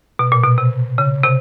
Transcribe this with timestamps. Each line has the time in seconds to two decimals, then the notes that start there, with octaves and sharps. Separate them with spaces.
0.19 B2
0.32 A#2
0.44 B2
0.58 C3
0.98 C#3
1.24 C3